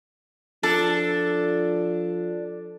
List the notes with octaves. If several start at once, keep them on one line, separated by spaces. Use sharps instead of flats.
F3 D4 A4